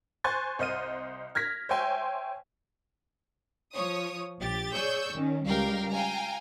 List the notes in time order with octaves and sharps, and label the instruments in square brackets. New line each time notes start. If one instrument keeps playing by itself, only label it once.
[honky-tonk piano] C5 G#5 C6 C#6 F#6 A6
C2 C5 D#5 F6 D#7
F6 G#6 A#6 B6
C5 C#5 E5 G5 G#5 C6
[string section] F3 C#5 D#6
A#1 G4 A6
G#4 C#5 D5 C#6 E6 G6
D#3 C#4
C#2 G3 A#4 F5 G5
F5 G5 G#5 A#5